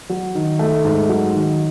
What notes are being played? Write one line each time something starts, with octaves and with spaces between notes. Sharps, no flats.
F#3
D#3
A3
G#2
F#3
D#3